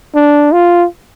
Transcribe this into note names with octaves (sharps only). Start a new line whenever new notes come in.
D4
F4